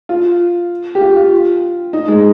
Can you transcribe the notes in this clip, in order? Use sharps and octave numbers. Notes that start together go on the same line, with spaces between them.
F4
G4
F4
F4
D#4
G#3